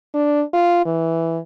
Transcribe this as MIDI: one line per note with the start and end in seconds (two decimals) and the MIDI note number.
0.14 0.42 62
0.53 0.82 65
0.85 1.38 52